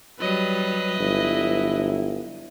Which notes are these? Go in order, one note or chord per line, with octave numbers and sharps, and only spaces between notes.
F#3 G3 B4 D#5
G1 F#3 E4